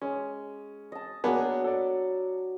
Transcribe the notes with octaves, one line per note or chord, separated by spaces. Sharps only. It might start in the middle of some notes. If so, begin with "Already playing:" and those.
G#3 C#4
D#5 A5
F#3 A#3 B3 D4 G#4
A4 D5